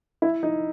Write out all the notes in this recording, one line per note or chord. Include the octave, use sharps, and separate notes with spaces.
E4
D#4